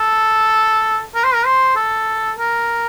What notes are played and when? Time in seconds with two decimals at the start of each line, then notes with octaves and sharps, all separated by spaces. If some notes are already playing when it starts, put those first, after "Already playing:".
Already playing: A4
1.15 A#4
1.24 C5
1.34 A#4
1.45 C5
1.76 A4
2.39 A#4